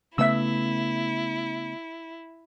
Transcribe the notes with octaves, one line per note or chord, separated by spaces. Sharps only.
C#3 A3 B3 E4 E5 E6